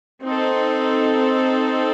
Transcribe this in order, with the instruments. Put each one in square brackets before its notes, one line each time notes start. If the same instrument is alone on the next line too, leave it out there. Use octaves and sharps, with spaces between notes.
[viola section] C4 D#4 A4